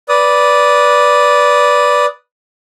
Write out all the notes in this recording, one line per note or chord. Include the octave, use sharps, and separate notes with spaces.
B4 D5 D#6